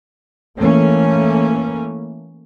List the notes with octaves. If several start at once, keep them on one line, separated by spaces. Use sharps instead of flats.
E3 A3 A#3 C#4